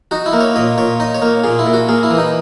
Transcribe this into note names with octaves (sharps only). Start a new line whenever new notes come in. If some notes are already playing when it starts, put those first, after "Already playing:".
D#4 F#4
E4
A#3
C#5
A#2 D#5
A#2 C#5
D#4 D#5
C#5
A#3
A#2 G#4
E4
A#2
F#4
A#3 G#4
E4
E3
D#4